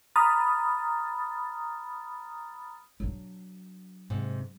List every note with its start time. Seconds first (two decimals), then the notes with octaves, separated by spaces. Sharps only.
0.16 A#5 B5 D#6 F6 A6
3.00 F#3 D4
4.10 G#2 C3